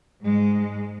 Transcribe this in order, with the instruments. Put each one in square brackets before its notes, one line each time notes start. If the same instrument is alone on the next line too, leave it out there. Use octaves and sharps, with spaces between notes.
[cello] G#2 G#3